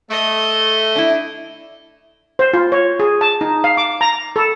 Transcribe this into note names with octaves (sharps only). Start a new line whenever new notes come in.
A3 D#5
D4 E4
C5
F4
C#5
G#4
A5
D#4
F5
D6
A#5
A4